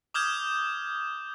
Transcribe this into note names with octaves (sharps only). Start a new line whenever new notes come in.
D6 D#6 F6 G6 G#6 E7